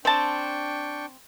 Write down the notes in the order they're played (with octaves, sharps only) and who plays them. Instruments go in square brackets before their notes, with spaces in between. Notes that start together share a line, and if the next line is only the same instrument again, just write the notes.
[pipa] C4 A5 [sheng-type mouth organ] D4 G5 C#6